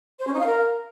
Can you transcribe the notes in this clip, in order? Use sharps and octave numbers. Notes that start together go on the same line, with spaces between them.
C5
C#4
D#4
F5
A#4